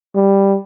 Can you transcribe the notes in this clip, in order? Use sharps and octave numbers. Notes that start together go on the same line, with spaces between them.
G3